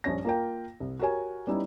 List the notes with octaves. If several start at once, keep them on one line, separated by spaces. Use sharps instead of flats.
A#1 G2 C#4 C#5 A#6
A#3 F4 A#4 F5 G5
C2
F#4 G4 A#4 C#5 G#5
G3 B3 C#4 D#4 E4